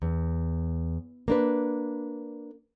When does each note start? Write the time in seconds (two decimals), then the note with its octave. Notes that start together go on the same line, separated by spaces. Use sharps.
0.02 E2
1.28 A#3 D4 B4